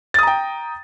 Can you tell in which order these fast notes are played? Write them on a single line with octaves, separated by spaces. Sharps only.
A6 D#6 A#5 G5